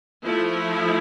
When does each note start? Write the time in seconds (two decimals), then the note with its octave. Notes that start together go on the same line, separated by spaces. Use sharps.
0.25 F3 A3 E4